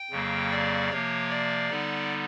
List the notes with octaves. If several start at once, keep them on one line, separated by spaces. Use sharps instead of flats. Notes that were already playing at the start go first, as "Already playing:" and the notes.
Already playing: G5
F2 C#3 F#3 A#3
D5
C3 F3 A#3 C#5
D5
D3 G3 B3 D#4